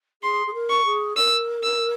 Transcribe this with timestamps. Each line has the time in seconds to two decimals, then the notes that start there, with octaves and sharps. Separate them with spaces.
0.22 G#4 C6
0.46 G#4
0.54 A#4
0.69 C#6
0.85 G#4
1.16 A#4 E6
1.63 E6